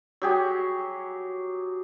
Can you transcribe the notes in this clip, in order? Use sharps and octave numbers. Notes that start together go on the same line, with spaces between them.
F#3 G4 G#4